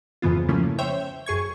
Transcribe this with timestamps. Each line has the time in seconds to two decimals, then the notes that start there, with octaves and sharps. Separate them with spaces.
0.22 F2 G#2 C#3 E3 B3 F4
0.48 C#3 F3 A3 A#3 C#4 E4
0.79 C5 C#5 E5 G5
1.26 F#2 G#4 C#6 G#6